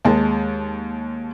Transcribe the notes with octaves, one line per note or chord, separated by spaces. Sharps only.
D#2 G#3 A5